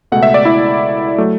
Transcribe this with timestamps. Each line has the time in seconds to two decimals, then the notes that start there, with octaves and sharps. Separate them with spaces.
0.12 C#2 B2 A3 F#5
0.23 E5
0.34 D5
0.45 E4 E5
1.18 F#3 A3